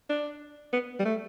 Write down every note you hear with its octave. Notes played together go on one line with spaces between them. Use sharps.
D4
B3
G3
A3